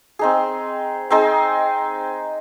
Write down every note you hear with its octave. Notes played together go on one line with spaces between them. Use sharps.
C4 D#4 G#4
C4 D#4 G#4